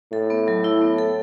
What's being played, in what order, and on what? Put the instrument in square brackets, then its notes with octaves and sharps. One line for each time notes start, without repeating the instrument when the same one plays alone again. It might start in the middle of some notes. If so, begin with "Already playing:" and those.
[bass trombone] A2 [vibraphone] A4
[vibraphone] B3
F#3
E4
B3
A4